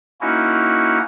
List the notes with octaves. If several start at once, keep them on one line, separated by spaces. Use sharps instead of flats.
A#3 C#4 D#4 E4 F#4